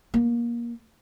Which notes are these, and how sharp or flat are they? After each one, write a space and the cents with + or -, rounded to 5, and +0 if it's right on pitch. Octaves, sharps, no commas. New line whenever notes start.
A#3 +20